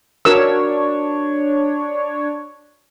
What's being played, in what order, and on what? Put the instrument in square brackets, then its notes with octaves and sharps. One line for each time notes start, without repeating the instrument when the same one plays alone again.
[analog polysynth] D4 C#5 [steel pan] F#4 A#4 E6